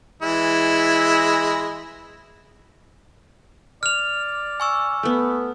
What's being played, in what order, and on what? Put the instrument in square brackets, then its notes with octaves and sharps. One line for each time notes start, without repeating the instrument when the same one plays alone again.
[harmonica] E3 G#3 E4
[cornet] D5 [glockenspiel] F6 F7
[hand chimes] G#5 C#6 E6
[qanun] A3 B3